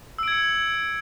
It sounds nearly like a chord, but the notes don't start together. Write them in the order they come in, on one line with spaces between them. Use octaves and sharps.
E6 D7 G#6 C#7